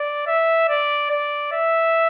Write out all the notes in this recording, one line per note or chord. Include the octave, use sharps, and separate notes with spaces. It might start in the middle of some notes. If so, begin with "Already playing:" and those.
Already playing: D5
E5
D5
D5
E5